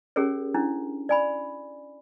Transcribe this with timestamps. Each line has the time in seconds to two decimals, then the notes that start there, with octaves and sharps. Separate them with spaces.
0.16 C#4 G4 G#4 A#4 C#5
0.54 C#4 D4 E4
1.09 D5 G#5 B5